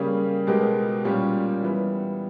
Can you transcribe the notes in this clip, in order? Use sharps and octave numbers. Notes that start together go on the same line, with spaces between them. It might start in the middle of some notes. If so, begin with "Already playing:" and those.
Already playing: C#3 G3 A#3 C#4 G#4
B2 G#3 B3 G4 A#4
A#2 G3 C#4 G4
E3 G3 B3